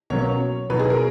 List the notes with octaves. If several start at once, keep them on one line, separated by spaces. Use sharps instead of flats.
B2 F#3 A#3 C#4 C#5
B2 F#3 B3 D#4 B4
G#4
A#4